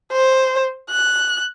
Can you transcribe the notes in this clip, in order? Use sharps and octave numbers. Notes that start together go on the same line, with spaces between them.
C5
F#6